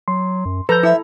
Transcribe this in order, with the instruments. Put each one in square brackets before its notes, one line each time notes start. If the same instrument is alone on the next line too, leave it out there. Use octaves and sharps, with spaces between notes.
[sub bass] F#3 [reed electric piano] C6
[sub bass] F#2
[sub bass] F3 [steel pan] A4 A#5 [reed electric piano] B4 G6
[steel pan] E4 [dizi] E5